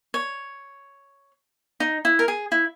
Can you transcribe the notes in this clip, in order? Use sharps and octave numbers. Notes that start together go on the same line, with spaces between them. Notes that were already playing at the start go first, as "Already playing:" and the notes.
C#5
D#4
E4
A#4
G#4
E4